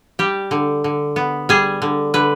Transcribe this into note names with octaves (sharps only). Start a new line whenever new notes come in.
G3 G4
D3
D3
B3
G3 G#4
D3
D3 B4